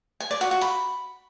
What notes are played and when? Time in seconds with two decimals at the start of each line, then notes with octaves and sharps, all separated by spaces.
0.20 G#5
0.31 D5
0.41 F#4
0.51 F#4
0.61 B5